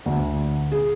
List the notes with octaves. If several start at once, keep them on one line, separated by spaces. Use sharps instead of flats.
D2
G#4